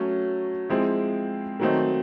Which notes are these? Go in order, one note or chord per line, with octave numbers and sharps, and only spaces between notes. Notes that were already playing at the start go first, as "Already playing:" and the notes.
Already playing: F#3 A3 C#4
F3 G#3 C4 E4 G#4
D#3 F#3 A3 C4 D#4